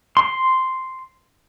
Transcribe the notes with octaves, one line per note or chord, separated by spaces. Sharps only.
C6